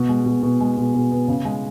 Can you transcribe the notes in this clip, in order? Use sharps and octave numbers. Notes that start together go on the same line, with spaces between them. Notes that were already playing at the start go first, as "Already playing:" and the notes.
Already playing: B2
G#3
B2
B2
G#3
B2
B2
B3
C#3
G#3